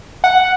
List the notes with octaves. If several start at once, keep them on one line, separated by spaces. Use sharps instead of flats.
F#5